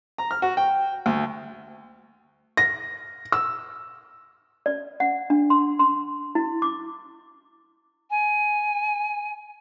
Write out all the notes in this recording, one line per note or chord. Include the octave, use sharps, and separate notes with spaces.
A#5
F6
F#4
G5
D2
A#6
E6
D5
F#5
D4
C6
C6
E4
D6
G#5